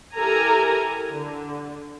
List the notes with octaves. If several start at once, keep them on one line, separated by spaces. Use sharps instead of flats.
E4 G4 A4 A#4 G#5 A#5
D3